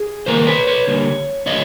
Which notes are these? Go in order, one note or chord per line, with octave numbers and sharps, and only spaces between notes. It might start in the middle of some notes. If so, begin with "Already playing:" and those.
Already playing: G#4
D#3 G3 A#3 A#4 C5
B4 C#5
B4 C#5
D3 G3 A#3
D3 F#3 A3 C#5 D#5